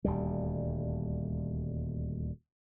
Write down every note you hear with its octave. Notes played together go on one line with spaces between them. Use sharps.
D#1 D2 G3